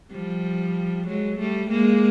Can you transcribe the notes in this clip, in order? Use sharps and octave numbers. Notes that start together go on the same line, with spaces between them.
F3 G3
F#3 G#3
G3 A3
G#3 A#3